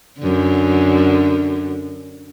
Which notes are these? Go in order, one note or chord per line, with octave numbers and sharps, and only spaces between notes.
F#2 D3